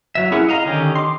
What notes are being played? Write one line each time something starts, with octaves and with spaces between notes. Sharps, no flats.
F#3 E5
C#4 E4 G#4 A#4 F#5
D#5 F5 A#5
D3 D#3 C#4 G4 D#5
C6 D6